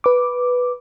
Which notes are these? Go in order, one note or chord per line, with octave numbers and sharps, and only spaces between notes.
B4 D6